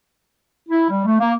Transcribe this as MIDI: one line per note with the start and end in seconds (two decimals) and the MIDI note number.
0.69 0.87 64
0.90 1.03 55
1.06 1.17 57
1.19 1.32 58